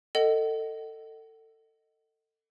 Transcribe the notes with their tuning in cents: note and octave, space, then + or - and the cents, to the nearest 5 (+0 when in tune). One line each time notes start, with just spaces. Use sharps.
A4 +25 D#5 +0 F#5 +35